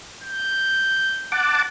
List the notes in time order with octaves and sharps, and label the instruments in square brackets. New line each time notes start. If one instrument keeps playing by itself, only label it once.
[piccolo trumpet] G6
[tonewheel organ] F#5 A5 D6